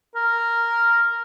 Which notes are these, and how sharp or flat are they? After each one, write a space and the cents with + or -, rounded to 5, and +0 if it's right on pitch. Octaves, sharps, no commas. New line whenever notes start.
A#4 -5